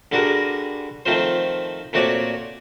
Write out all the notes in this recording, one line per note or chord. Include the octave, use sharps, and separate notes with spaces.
D3 G3 F#4 G#4 A#4
D#3 F3 A3 C4 F4 C5
A#2 A3 C4 F#4 C#5 D5